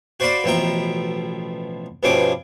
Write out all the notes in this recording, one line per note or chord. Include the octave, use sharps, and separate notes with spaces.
F#4 C5 D5 F5 B5 C6
A1 B2 F3 E5 G5 A#5
G2 B2 F3 C#4 D#5 D6